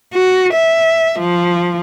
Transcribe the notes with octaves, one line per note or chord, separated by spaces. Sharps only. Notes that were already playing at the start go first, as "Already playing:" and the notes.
F#4
E5
F3